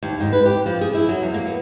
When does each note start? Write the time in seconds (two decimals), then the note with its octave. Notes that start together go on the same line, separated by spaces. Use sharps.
0.03 D#2
0.20 G#2
0.33 B4
0.46 G4
0.66 F3
0.81 G#4
0.95 E4
1.09 F#3
1.22 E2
1.34 A#3
1.46 B3